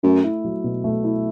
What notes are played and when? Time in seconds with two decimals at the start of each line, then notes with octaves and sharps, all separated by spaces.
0.03 F#2 A3
0.24 E4
0.44 F#3
0.64 B2
0.84 A3
1.04 E4